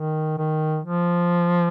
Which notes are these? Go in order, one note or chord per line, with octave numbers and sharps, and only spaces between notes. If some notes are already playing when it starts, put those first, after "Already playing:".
Already playing: D#3
D#3
F3